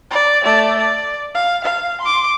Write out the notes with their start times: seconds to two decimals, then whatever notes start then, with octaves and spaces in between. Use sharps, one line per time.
0.11 D5
0.43 A3 D5
0.79 D5
1.35 F5
1.64 F5
2.01 C6 D6